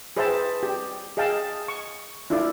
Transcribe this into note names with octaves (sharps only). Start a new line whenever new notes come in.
G#4 B4 C5 E5 G5 A5
G4
G#4 D#5 F5 G5 A5
C#6
D4 E4 F4 A4 D5